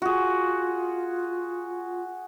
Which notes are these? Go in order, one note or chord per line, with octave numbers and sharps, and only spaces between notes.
F4 F#4 G#4